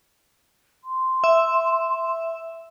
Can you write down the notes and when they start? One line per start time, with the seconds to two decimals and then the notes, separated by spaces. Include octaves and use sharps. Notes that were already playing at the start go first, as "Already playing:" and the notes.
0.84 C6
1.24 E5